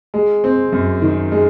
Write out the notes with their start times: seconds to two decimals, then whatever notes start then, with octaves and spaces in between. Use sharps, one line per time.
0.14 G#3
0.44 C4
0.72 F#2
1.02 D#3
1.32 G#3